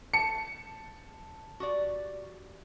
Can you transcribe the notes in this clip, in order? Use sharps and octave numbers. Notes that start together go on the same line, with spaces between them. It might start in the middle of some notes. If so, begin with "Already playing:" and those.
A5 C#7
F#4 G4 D5